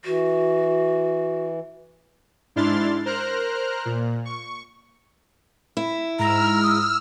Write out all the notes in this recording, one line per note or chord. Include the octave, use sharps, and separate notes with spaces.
E3 F#4
G#2 D4 E4 C6 F6 A6
A#4 C5 A#5 F6 F#6
A#2
C#6
E4
G#2 A#5 E6 F6
D#6